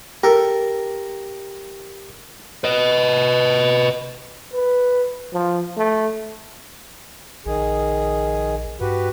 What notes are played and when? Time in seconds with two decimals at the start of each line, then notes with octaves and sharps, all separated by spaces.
0.23 G4 A4 A#4
2.64 B4 D#5
4.53 B4
5.33 F3
5.77 A3
7.46 A#1 D#3 G#4
8.81 G2 F#4 G4 B4